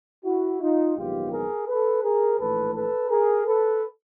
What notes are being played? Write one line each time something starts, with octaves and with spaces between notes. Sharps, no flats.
E4 F#4
D#4 F4
A#1 G#2 D#3 F#3 B3 F4 G4
G#4 A#4
A4 B4
G#4 A#4
A#1 A2 E3 A3 A4 B4
A4 B4
G#4 A#4
A4 B4